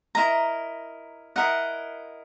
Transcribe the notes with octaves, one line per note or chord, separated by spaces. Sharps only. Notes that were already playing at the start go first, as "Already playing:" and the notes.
E4 A#4 D#5 A#5
E4 A#4 D#5 F#5